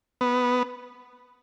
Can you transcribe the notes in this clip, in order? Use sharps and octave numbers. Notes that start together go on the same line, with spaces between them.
B3